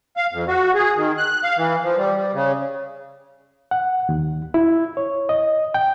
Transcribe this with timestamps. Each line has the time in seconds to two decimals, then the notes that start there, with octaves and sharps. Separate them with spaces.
0.17 F5
0.33 F2
0.48 F#4
0.75 G#4
0.96 D#3
1.18 F#6
1.43 F5
1.57 E3
1.83 F3
1.97 G3
2.16 G3
2.33 C#3
3.71 F#5
4.09 D#2
4.54 E4
4.97 C#5
5.29 D#5
5.74 G5